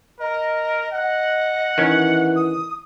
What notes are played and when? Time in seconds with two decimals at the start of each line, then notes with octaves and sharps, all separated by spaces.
0.20 A#4 D#5
0.93 D#5 F#5
1.78 D#3 E3 C#4
2.36 D#6